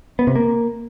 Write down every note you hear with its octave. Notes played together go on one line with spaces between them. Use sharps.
B3
C3
A#3